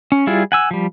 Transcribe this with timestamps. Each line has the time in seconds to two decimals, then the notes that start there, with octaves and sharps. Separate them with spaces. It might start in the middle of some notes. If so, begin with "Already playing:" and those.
0.12 C#4
0.27 G3 E4 F4 G#4 D5
0.52 F#5 G#5 E6
0.71 F3 G3